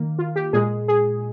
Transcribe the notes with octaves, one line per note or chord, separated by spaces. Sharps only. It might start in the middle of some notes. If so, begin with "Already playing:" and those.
Already playing: D#3 A#3
F4
G4
A#2 G#3 G#4
G#4